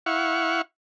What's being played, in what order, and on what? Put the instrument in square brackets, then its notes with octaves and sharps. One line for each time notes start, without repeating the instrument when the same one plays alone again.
[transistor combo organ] E4 F5 F#5 C#6